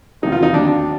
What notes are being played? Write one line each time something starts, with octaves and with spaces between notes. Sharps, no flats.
E2 C3 D#3 F#3 A3 D#4
F4
D#4
D#2 D3 F#3 D4